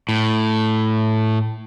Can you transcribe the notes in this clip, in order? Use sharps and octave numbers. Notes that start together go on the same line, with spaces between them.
A2